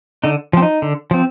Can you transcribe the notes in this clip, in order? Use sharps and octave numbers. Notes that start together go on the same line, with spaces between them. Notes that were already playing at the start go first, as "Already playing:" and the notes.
D3 D#4
F3 C4
D#4
D3
F3 C4